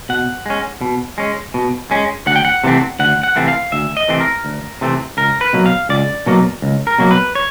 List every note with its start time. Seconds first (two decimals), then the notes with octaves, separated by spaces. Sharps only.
0.09 B2 F#5
0.46 G#3 C#4
0.81 B2
1.18 G#3 C#4
1.54 B2
1.91 G#3 C#4
2.27 D2 F#5
2.36 G5
2.45 F#5
2.64 C3 E3 A3 C4
2.99 D2 F#5
3.23 F#5
3.36 C3 E3 A3 C4
3.48 F5
3.72 D2 E5
3.97 D#5
4.08 C3 E3 A3 C4
4.20 A#4
4.45 D2
4.81 C3 E3 A3 C4
5.17 C#2 A#4
5.41 B4
5.53 B2 F#3 A#3
5.66 F5
5.89 C#2 D5
6.26 B2 F#3 A#3
6.62 C#2
6.87 A#4
6.98 B2 F#3 A#3
7.11 B4
7.35 C#5